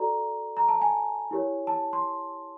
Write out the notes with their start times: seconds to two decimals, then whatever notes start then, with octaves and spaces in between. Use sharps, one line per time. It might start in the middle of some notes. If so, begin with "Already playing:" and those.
Already playing: F#4 A4 D5 A#5
0.57 A#5
0.69 A5
0.82 G#5
1.31 E4 G4 A#4 C#5
1.67 A5
1.93 C6